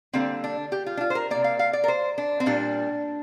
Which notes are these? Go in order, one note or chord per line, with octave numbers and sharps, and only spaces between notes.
D3 G3 A#3 C4
D4
G4
F4
D4
F4
C5
A#4
C3 A#3 D5
F5
F5
D5
A#4
C5
D4
C4
A#2 G3 A#3 D4